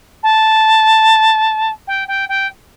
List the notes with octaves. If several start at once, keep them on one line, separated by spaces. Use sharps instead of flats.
A5
G5
G5
G5